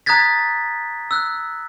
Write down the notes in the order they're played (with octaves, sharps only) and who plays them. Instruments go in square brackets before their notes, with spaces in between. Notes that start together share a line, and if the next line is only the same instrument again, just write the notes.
[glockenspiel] A#5 D#6 F#6 G#6 A6 B6
E6 F#6